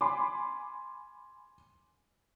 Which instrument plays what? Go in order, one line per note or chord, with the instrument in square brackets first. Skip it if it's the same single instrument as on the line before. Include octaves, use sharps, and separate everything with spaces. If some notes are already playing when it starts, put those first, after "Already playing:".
[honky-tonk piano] G#5 B5 C6 D6